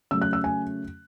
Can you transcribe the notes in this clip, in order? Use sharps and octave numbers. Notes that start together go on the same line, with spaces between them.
C#3 F#3 A3 E6
F#6
E6
G#5